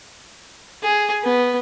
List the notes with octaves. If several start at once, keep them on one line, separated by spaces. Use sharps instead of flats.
G#4
B3